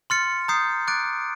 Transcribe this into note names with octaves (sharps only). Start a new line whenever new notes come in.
C6 F6 A6 C#7
A#5 D#6 G6 C7
D6 F#6 A6 D7